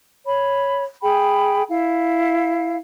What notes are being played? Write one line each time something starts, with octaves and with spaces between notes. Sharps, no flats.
C#5 B5
G#4 G5 B5
E4 F5